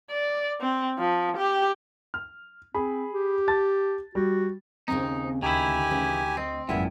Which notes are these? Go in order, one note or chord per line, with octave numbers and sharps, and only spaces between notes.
D5
C4
F3
G4
F6
C4 G#4 B5
G4
A5 A6
G3 F#4
D#2 A2 C#3 C4 D#4
D2 D#3 E4 G4 G#5
C#3 E3 C#4
C4 D#5
G#1 C#2 F#2 A#2 B3 E4 E5 G5